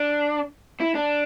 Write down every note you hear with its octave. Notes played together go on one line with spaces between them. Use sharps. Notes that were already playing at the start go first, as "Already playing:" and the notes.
Already playing: D4
E4
D4